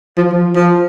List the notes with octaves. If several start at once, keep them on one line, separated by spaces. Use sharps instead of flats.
F3
F3
F3